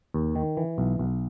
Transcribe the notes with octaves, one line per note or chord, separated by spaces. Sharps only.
D#2
D#3
E3
B1
B1